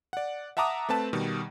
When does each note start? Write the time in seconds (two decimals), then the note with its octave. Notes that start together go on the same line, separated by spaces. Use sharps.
0.13 D5 F#5
0.57 E5 F#5 A5 A#5 D6 D#6
0.89 A3 C4 B4 A5
1.13 B2 D#3 G3